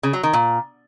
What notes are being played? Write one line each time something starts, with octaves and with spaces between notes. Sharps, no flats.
C#3
F#3
D#3
A#2